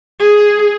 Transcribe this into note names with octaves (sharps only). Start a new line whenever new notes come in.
G#4